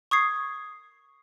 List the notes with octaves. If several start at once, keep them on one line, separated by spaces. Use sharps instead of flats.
C#6 D#6 G#6 C7